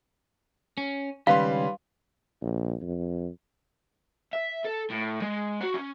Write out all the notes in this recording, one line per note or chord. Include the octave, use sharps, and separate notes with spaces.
C#4
C#2 D#3 G3 C#4 B4 F5 C6
A#1
F2
E5
A4
A2
G#3
F#4
C#4